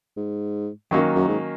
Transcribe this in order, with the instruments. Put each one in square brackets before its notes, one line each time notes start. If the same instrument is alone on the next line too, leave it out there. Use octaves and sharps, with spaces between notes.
[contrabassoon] G#2
[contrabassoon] F#2 [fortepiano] D#3 F#3 A#3 C#4
[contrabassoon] F#2
G#2